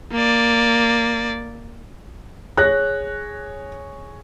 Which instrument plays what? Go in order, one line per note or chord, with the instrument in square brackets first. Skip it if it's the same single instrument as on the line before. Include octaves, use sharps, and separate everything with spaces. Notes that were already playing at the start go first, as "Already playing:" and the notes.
[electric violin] A#3 D5
[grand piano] G#4 C#5 A#6 [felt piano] F#6